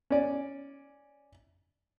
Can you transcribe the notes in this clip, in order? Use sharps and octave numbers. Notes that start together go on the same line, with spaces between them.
C#4 D5